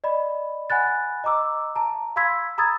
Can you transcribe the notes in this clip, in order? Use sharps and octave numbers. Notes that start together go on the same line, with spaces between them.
D5 D#5 B5
F#5 G#5 B5 F#6 A6
D#5 A#5 D6 E6
A5 A#5
F5 B5 C6 E6 G#6 B6
A#5 B5 D#6 E6 G#6 A6